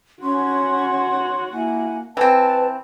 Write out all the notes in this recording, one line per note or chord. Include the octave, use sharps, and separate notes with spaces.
C#4 F#4 C#5 F#5 C6 C#6
A#3 E4 G#5
E3 C4 B4 A5